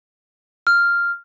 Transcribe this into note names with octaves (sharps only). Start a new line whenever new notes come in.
F6